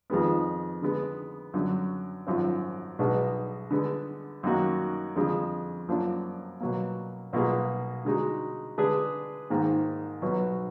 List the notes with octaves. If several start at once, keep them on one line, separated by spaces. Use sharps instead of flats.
F2 D#3 G#3 B3
D3 G#3 B3
F#2 D3 F#3
G#1 F#2 F3
B1 B2 G#3 D4
D3 G#3 B3
F#2 D#3 A#3 D#4 F#4
F2 D3 G#3
F#2 F3 A#3 D4
B2 F#3 A#3
B1 B2 A#3 F4 G#4
D3 G#3 D#4 F#4
D3 G#3 D4 G#4 B4
G#2 D#3 A#3
B1 B2 F#3